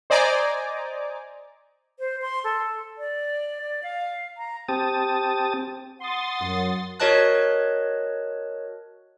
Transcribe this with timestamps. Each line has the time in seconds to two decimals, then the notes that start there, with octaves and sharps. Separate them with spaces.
0.10 C5 D5 D#5 G#5 A#5 D6
1.99 C5
2.22 C6
2.44 A4
2.98 D5
3.62 D5
3.83 F5
4.37 A#5
4.68 C4 G4 A5 D#6
6.00 F#5 C6 D#6 A6
6.41 F#2
7.00 F#4 A#4 C#5 D#5 A5 F#6